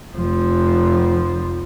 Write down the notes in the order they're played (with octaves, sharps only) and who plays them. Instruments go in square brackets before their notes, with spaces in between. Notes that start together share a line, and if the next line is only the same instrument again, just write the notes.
[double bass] F1 F3